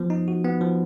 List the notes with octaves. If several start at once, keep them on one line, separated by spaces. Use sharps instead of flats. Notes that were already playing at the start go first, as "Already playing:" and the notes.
Already playing: F3 B3
D#4
F#4
B3
F3